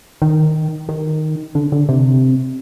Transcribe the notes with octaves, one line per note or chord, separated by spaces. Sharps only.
D#3
D#3
D3
D3
C3